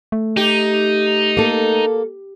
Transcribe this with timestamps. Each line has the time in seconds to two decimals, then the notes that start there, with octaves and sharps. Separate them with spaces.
0.12 A3
0.37 D#4 G4
1.37 A#3 A4